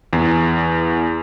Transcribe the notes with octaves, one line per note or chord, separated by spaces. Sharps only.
E2